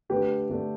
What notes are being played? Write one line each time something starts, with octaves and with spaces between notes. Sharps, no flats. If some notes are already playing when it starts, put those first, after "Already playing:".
D3 A3 D4 G4 B4
D3 A3 D4